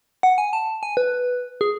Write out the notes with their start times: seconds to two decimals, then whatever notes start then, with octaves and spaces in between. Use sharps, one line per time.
0.23 F#5
0.38 G#5
0.53 A5
0.83 G#5
0.97 B4
1.61 G#4